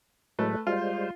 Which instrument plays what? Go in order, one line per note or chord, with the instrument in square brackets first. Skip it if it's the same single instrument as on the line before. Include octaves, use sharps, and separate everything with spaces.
[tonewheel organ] A2 F#3 G#3 [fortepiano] A3 B4
[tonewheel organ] G3 G#3 C5 [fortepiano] F4